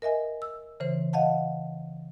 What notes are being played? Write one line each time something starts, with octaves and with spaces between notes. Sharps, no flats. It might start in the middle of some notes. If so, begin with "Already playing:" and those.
A#4 D#5 E5 G#5
E6
C#3 E3 C5
D#5 F5 F#5 A5